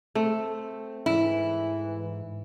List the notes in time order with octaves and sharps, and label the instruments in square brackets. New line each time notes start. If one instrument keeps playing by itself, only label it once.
[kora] A3 [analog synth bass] C4
[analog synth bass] G#2 [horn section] E3 [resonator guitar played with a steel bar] E4